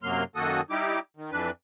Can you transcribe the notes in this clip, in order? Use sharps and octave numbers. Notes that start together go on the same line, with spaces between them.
F#2 C3 F#3 A#3 C6 F6
F#2 D#3 A#3 F#4 A4 D#6
G3 D#4 E4 G4 D6
D#3
F2 E3 D4 B4